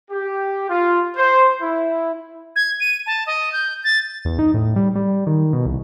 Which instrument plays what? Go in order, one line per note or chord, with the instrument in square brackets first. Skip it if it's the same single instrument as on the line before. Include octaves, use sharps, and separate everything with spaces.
[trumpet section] G4
F4
C5
E4
[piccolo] G#6
D#7
A5
D#5
G6
A6
[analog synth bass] E2
D#4
A2
G3
G3
D#3
B2
C2